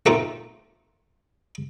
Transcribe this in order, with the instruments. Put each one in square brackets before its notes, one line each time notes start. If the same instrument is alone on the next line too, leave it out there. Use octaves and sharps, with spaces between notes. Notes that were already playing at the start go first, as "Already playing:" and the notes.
[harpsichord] A3 A#3 C4 D#4 F4